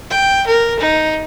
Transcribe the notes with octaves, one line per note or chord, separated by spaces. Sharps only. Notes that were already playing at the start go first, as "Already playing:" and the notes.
G5
A#4
D#4